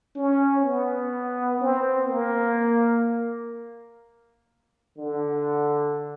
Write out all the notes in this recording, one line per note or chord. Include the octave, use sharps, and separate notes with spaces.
C#4
B3
C4
A#3
D3